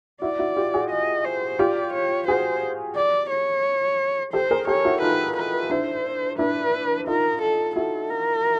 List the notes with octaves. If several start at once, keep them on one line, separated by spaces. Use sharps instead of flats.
E4 F#4 D5
E4 F#4
F4 G4
F#4 G#4
D#5
C5
F4 G4 D5
C#5
F#4 G#4 C5
D5
C#5
G4 A4 C5
G#4 A#4
G4 A4 C#5
E4 F#4
D#4 F4 B4
B4
D4 E4 C5
D4 E4 B4
D#4 F4 A#4
A4
E4 F#4 A4
A#4